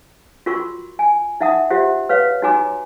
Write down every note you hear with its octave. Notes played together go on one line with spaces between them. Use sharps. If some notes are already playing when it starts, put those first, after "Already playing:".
F4 F#4 A#4 C6 C#6
G#5
D#4 E5 F#5 A5 D#6
F4 G4 C5 E5 F#5
B4 C#5 F5
D#4 F#4 C#5 G#5 A#5 D6